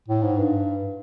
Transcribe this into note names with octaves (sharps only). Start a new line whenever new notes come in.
A2
G#2
G2